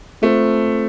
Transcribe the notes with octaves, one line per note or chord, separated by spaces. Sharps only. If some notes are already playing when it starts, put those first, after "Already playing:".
A3 C4 F4 A4 C5